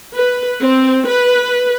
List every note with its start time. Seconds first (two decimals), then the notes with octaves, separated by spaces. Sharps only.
0.14 B4
0.60 C4
1.06 B4